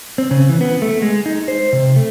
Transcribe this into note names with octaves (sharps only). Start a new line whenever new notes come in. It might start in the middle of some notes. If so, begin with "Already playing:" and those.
C4
C#3
E3
B3
A3
G#3
D#4
C5
C3
A3